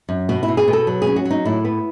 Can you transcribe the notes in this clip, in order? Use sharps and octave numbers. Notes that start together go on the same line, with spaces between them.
F#2
B2 F#4
E4
B2
G#4
B2
A4
F#3
G#4
C#4
F#4
F#3
D#4
A2 E4
B3